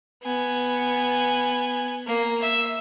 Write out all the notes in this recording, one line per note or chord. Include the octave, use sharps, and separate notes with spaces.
B3 G#5
A#3
E5